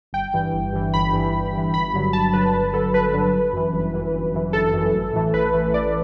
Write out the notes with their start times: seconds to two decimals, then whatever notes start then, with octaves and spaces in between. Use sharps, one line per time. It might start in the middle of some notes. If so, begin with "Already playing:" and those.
0.13 G1 G5
0.34 G2 E3
0.53 G1
0.73 G2 E3
0.94 G1 B5
1.13 G2 E3
1.33 G1
1.53 G2 E3
1.74 G1 B5
1.93 G2 D3 F#3
2.13 G1 A5
2.33 G2 D3 F#3 B4
2.54 G1
2.73 G2 D3 F#3 A4
2.93 G1 B4
3.13 G2 D3 F#3
3.33 G1
3.53 F#2 E3
3.73 G1
3.94 F#2 E3
4.14 G1
4.34 F#2 E3
4.53 G1 A4
4.73 F#2 E3
4.93 A1
5.13 A2 E3 A3
5.33 A1 B4
5.54 A2 E3 A3
5.74 A1 D5